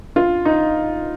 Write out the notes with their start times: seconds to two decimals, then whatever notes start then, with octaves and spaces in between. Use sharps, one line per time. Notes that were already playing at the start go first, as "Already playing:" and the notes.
0.16 F4
0.45 D#4